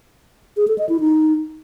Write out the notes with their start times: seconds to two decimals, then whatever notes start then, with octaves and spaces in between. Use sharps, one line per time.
0.57 G#4
0.68 A4
0.78 D#5
0.89 E4
1.00 D#4